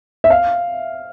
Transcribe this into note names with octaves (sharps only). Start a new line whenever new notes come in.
E5
F5